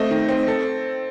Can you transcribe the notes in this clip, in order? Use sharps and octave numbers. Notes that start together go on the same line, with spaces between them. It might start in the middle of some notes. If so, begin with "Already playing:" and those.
Already playing: A3 C4 D#5
D#3
C4
A4